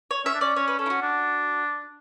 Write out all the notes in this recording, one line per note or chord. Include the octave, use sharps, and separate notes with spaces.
C#5
C#4 E5
D4
C#4 D5
C#4 C#5
B4
C#4 A4
E4
F#4
D4